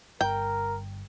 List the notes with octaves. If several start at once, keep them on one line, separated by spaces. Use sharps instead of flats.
G1 A#4 G5